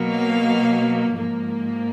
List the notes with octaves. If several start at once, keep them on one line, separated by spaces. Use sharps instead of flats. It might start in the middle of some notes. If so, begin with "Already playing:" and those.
Already playing: B2 F#3 A#3
F5
G#2 F3 A#3